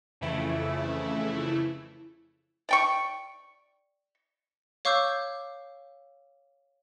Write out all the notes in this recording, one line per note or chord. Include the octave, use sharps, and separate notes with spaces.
F2 C#3 E3 A3 E4
D5 G5 C#6
C#5 F5 C#6 D6 E6 G6